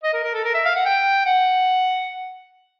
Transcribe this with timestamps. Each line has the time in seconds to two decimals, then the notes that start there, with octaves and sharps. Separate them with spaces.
0.04 D#5
0.13 A#4
0.24 A#4
0.34 A4
0.45 A#4
0.55 E5
0.65 F5
0.76 F#5
0.85 G5
1.26 F#5